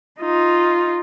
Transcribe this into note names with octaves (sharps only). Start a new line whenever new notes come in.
D#4 F4